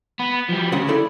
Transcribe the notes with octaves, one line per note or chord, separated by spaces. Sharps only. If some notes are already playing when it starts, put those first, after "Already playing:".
B3
F3 G3
D2 C#3 F#5
E4 A4 D5